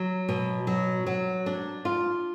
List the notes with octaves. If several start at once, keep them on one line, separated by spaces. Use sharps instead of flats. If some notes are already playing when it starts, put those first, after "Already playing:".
Already playing: F#3
B2
F#3
F#3
D4
F4